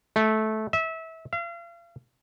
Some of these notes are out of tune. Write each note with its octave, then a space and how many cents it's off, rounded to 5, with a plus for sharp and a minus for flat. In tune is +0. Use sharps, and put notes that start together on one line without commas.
A3 -15
E5 -25
F5 -40